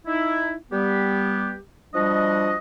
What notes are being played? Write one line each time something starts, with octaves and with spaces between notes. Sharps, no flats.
D#4 E4
G3 B3 G4
F3 G3 D4 F#4 D#5